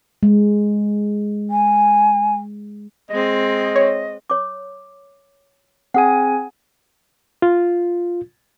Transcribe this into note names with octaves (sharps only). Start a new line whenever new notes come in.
G#3
G#5
G#3 C4 D#5
C#5
C#5 D6
C4 G#4 F#5 G#5
F4